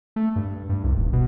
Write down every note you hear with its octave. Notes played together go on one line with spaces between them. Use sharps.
A3
G2
G2
C2
D#1
B2